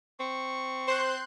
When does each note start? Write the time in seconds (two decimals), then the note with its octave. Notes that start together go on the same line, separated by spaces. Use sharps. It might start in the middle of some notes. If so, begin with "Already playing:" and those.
0.20 C4 C#6
0.88 C5 C6 F#6 G6